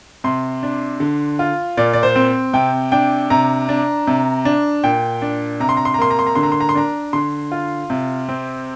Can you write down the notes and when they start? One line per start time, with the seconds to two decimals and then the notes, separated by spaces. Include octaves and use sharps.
0.24 C3 C6
0.63 D4
1.00 D3
1.39 F4
1.77 A#2 D5
1.93 D5
2.03 C5
2.16 C4
2.53 C3 G5
2.92 D4 G5
3.30 C3 A#5
3.69 D4
4.07 C3
4.45 D4
4.84 A#2 G5
5.22 D4
5.60 C3 A#5
5.69 C6
5.77 A#5
5.85 C6
5.94 A#5
5.98 A#3 C6
6.11 A#5
6.19 C6
6.27 A#5
6.35 D3 C6
6.43 A#5
6.52 C6
6.60 A#5
6.69 C6
6.75 D4 A#5
7.13 D3 C6
7.52 F4
7.90 C3
8.29 C4